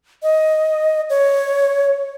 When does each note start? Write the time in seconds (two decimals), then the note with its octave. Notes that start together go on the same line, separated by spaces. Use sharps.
0.23 D#5
1.10 C#5